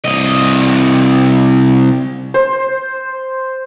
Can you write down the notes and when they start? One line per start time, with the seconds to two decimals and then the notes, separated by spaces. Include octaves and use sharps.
0.05 C2 D#5
2.34 C5